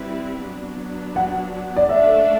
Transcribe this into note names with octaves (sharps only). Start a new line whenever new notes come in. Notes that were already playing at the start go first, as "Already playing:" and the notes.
Already playing: G3 C4 E4 B4
F#3 B3 D4
F#5
D5
A3 D4 A4 E5